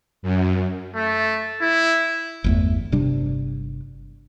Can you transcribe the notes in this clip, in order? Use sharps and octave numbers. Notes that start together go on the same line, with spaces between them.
F#2
A3
E4
G1 E2 A3
G1 C3 G3 D4